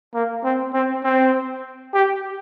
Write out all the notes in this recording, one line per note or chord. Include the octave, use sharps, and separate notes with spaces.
A#3
C4
C4
C4
G4